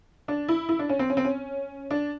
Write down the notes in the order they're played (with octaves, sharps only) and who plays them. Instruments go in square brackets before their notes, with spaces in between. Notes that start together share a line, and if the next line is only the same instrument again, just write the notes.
[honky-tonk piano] D4
E4
E4
D4
C#4
C4
C#4
C4
C#4
D4